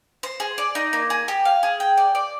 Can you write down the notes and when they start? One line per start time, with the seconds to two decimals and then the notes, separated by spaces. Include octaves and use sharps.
0.23 C5
0.40 G#4
0.58 D5
0.75 D#4
0.93 A#3
1.10 G#4
1.28 G4
1.45 F5
1.63 G#4
1.80 G5
1.98 D5
2.15 D5